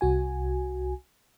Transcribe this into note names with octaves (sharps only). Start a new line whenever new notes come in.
C2 F#4 G#5